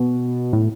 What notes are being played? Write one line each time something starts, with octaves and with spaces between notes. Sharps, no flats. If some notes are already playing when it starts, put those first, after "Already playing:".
Already playing: B2
A2